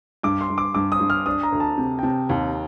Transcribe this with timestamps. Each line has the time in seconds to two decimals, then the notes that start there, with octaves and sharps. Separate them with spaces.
0.23 G2 D6
0.41 C6
0.50 G2
0.58 D6
0.75 G2 D6
0.92 D#6
1.00 G2
1.10 F6
1.26 D4 D#6
1.43 A#5
1.52 D2
1.60 A5
1.77 C3
1.99 G5
2.03 C3 A5
2.29 D#2